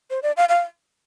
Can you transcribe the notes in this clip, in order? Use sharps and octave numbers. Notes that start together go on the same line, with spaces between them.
C5
D5
F5
F5